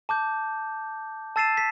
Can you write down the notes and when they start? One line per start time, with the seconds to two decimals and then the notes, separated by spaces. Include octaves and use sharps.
0.09 A5 D6 G6
1.36 A5 E6 A6 C7 D#7 E7
1.57 B6